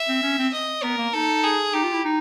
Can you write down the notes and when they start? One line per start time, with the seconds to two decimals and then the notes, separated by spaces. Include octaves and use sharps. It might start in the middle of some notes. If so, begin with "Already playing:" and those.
Already playing: E5
0.09 C4
0.23 C#4
0.38 C4
0.53 D#5
0.83 B3 A#4
0.98 A#3
1.13 D#4 A4
1.43 G#4
1.73 D#4 G4
1.83 F4
1.94 E4
2.05 D#4